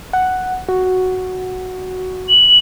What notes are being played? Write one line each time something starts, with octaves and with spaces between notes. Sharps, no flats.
F#5
F#4
F#7